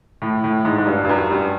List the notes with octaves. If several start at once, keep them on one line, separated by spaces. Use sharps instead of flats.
A2
A2
G#2
G#2
G2
G2
F#2
G2